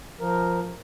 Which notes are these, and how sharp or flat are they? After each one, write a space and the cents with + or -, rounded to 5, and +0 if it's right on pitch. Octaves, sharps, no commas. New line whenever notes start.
F3 +0 A#4 +0